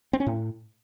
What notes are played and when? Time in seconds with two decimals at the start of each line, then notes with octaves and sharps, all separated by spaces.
0.13 C4
0.20 C#4
0.26 A2